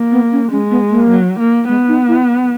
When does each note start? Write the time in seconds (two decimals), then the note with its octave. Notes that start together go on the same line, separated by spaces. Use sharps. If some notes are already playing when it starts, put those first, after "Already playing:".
Already playing: A#3
0.11 B3
0.32 C#4
0.51 G#3 C#4
0.70 B3
0.90 A#3
1.10 F#3
1.39 A#3
1.68 G#3 B3
1.88 D#4
2.08 E4